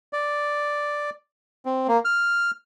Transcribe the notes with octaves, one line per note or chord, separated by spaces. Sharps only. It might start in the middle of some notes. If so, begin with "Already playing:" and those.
D5
C4
A#3
F6